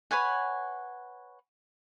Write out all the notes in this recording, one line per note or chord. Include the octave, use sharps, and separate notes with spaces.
B4 C#5 F#5 G#5